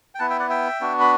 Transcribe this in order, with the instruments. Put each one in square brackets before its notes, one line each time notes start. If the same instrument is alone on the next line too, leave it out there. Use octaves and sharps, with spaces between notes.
[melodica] G5
B3 E4 F#5 A5
E5 G5
D5 F#5
E5 G5
B3 D4 F#4
B5